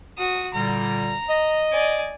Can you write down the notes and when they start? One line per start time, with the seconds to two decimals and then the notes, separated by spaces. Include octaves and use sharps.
0.18 F#4 D#6
0.54 A#2 D3 G3 A#5
1.29 D#5
1.72 D5 G#5